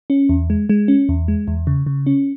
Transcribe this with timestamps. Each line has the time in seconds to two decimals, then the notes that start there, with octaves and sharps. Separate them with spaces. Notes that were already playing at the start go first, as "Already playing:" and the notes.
0.10 C#4
0.29 E2
0.50 G#3
0.69 G#3
0.88 C#4
1.09 E2
1.28 G#3
1.48 E2
1.67 C#3
1.86 C#3
2.06 C#4